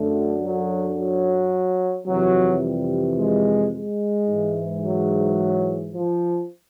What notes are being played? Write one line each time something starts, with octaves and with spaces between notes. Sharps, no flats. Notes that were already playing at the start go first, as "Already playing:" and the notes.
Already playing: F#2 D3 A3
F#3
F#3
F2 C3 E3 F#3
G3
G#3
G#3
G#2 E3
F#3
F3